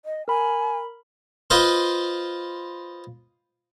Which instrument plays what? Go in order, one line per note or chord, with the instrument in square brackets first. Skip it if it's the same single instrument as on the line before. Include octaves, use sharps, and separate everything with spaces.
[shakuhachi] D#5
[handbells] A#4 B5 [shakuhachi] G#5
[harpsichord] F4 B4 C5 D#5 F5 C6